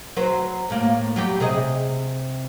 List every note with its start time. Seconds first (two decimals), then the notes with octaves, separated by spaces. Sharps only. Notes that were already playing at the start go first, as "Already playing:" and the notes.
0.17 F#3 B4 C5
0.70 A2 A#3
1.16 F#3 G3 G4
1.40 C3 G#4 D#5